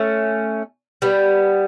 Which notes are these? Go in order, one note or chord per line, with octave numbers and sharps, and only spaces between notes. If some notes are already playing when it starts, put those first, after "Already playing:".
Already playing: A3 C#4
G3 B3